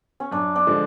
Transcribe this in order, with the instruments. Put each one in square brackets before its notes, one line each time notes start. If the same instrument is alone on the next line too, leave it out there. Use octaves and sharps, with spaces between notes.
[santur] C#4
[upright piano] F#2 [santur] D4
[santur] D4
[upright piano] D3 F3 G#3